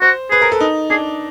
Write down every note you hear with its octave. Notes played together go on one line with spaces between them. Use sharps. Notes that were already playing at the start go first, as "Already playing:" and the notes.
F#4 C5
G#4 B4
A#4
A4
D#4
D4 G#4